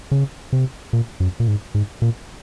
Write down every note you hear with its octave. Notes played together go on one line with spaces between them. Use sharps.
C#3
C3
A#2
F#2
A#2
G#2
G#2
A#2